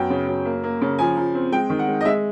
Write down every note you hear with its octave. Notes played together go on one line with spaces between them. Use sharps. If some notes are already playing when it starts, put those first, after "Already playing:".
Already playing: F#2 B3 G5
C#3
F#2
A#3
A#3
C#3
F3 G#5
F3
C4
G#3 G5
D#3
F#5
G#3
D#5
G#3 E5